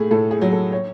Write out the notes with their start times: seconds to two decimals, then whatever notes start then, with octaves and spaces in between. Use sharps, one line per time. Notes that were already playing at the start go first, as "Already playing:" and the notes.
Already playing: A2 A3 G#4
0.11 A2 A4
0.31 G#4
0.42 F#3
0.52 A4
0.72 C#5